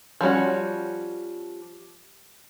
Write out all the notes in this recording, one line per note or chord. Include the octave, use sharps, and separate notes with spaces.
F3 G3 C#4 F#4